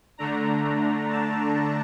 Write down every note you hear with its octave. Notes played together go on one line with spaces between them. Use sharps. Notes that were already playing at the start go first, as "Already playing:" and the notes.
D3 A3 D4 A#5
A5